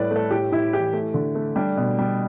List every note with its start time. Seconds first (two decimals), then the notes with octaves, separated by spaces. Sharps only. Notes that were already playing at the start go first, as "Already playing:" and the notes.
Already playing: A2 G3 A3 B4 D5
0.11 A3
0.16 A4
0.31 A2 G4
0.52 A2 E4
0.73 E3 G4
0.93 A3
1.14 D3
1.35 A3
1.56 G3 D4
1.77 B2
1.98 G3